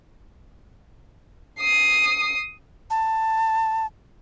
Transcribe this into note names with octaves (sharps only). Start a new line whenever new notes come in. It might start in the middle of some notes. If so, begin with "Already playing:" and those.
D#6 C7
A5